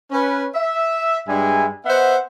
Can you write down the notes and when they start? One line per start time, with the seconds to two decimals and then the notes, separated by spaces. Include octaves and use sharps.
0.11 C#4 B4
0.54 E5
1.27 G2 G3 G#3 E5 G#5
1.86 B3 C5 D#5 E5 F#5